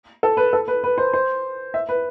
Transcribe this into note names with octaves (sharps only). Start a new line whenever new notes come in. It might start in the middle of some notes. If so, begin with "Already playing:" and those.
A4
B4
A4
B4
B4
C5
C5
E5
B4